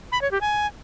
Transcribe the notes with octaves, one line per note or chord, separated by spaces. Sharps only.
B5
C#5
G4
G#5